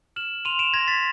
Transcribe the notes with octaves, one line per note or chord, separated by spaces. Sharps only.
F6 E7 F#7
C6 D#7 F7
D7 E7
C6 G#6 A#6
A6 B6